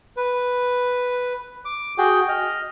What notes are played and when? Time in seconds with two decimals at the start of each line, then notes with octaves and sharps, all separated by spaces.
0.17 B4
1.65 D6
1.98 F#4 G#4 G5
2.29 D#5 F6